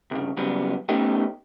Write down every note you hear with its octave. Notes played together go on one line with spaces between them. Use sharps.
C2 G2 C#3
C#3 F#3 G3 B3
A3 B3 C#4 D#4 G4